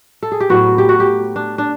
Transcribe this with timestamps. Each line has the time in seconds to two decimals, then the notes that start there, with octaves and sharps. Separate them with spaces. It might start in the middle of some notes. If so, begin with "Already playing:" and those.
0.23 A4
0.32 G#4
0.40 G4
0.49 A2 F#3 B3 F#4
0.78 G4
0.89 F#4
1.00 G4
1.36 D4
1.58 D4